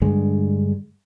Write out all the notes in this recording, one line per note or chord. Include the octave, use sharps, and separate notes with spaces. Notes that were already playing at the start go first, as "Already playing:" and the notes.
G2 D3 G#3